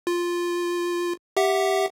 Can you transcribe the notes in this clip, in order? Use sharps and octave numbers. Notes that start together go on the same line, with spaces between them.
F4
G4 E5 F#5